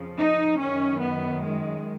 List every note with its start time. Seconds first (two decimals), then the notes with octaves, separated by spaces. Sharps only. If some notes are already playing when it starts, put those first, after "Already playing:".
Already playing: F2 C#3 F3
0.19 D#4
0.60 F#2 D#3 C#4
1.02 B3
1.42 G#3